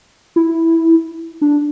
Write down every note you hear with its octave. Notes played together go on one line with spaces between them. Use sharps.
E4
D4